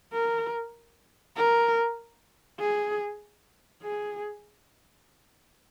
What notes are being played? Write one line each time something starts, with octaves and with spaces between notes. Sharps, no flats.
A#4
A#4
G#4
G#4